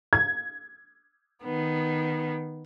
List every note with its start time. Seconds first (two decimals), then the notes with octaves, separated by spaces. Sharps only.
0.13 G#6
1.42 D#3 B3